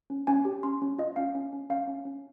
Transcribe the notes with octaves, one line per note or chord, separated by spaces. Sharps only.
C#4
C#4 G#5
G4
C#4 C6
C#4
F4 D#5
C#4 F5
C#4
C#4
C#4 F5
C#4
C#4